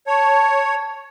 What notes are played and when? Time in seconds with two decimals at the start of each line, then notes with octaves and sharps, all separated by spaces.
0.07 C#5 A5